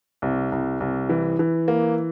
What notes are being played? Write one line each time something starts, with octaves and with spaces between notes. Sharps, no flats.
C2
C2
C2
E3
E3
A#3